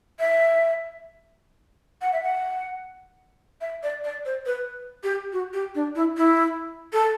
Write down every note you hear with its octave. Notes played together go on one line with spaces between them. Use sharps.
E5
F#5
E5
F#5
E5
D5
D5
C5
B4
G4
F#4
G4
D4
E4
E4
A4